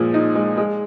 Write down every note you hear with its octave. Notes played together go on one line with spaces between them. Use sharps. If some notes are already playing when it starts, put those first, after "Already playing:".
Already playing: A#2 F3 G#3
D#4
G#3
G#3